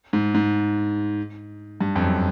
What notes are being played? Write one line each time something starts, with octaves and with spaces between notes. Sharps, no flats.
G#2
G#2
G2
F2
F#2